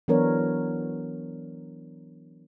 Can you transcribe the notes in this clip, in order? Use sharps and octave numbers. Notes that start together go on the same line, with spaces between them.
E3 F#3 B3 D4 A#4 C#5